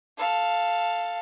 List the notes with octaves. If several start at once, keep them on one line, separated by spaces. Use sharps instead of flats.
A4 F5